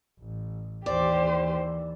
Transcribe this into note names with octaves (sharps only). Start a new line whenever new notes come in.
A1
D#2 E3 G4 C5 D5